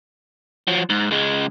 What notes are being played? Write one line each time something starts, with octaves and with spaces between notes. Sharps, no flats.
F3 F#3
G#2
C#2 G#3